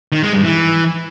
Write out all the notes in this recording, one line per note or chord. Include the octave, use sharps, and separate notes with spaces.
D#3
G#3
G2
E3